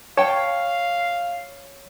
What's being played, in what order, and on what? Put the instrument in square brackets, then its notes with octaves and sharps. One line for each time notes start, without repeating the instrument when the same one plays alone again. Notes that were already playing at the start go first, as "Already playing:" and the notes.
[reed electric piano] C#5 [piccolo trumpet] F5 [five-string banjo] G5 A5